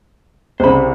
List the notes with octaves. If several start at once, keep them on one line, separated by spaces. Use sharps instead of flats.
C2 C#3 C5 B5